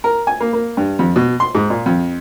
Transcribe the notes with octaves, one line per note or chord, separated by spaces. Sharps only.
A#4
G#5
A#3
A#3
G2
F2
B2
C6
G#2
A#2
F2